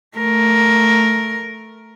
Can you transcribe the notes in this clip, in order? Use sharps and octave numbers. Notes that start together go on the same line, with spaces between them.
A3 A#4